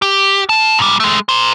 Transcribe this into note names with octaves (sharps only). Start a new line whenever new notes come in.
G4
F4 A5
G#2 G3
G#3 A3
A#4 C5